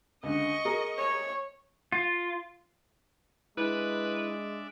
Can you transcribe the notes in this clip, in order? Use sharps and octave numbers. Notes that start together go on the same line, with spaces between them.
C#2 D3 D#5 C#6
G#4 A#4
C#5
F4
G#3 D4 E4 B4 D5 E5